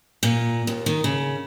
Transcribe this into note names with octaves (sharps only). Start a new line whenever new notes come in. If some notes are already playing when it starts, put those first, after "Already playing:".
A#2
D#2
D#3
C#3